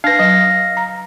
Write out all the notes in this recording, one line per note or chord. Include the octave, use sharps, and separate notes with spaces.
D4 B4 F5 A#6
F#3
A#5